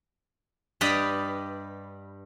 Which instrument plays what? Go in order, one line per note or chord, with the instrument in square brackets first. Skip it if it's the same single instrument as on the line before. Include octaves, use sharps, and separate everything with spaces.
[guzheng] G2 G4 B4 D5 D#5 B5